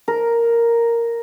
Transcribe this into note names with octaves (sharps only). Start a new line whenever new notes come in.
A#4